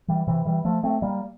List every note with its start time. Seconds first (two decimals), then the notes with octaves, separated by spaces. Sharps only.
0.08 E3 G3
0.27 C3 E3
0.45 E3 G3
0.65 F3 A3
0.83 A3 C4
1.02 G3 A#3